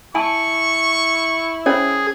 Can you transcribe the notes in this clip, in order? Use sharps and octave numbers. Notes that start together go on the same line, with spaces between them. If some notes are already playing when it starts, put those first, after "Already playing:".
E4 G#5 A5 C#6
C#4 G#4 C5 C#5